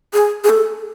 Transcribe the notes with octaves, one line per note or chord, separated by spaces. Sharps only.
G#4
G#4
A4